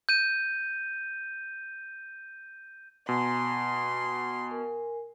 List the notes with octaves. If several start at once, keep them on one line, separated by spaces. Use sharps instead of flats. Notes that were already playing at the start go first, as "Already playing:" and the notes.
G6 D#7
B2 G#5 A#5 C6
A#4 G#5